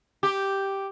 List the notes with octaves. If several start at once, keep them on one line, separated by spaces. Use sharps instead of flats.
G4